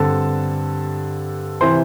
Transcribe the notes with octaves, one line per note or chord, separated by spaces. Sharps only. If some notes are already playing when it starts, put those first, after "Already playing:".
Already playing: G2 D3 C4 A4 A5
C3 E3 C5 C6